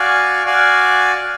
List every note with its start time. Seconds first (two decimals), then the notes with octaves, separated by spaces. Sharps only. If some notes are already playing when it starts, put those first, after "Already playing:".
Already playing: F#4 D5 F5 G#5
0.46 F#4 D5 F5 G#5